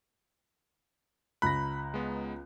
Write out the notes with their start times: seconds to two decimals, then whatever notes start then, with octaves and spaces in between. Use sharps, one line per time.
1.42 C#2 A#5 B5 F#6 A#6
1.94 G#3 B3